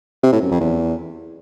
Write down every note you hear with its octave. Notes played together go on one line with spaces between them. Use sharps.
C3
A2
F#2
F2
E2